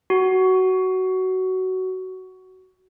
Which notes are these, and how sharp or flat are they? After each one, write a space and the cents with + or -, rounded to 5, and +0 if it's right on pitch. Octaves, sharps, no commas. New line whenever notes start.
F#4 +15